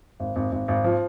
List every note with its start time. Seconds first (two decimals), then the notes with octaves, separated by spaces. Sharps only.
0.20 G#1
0.36 G#1
0.52 G#1
0.68 G#1
0.84 F3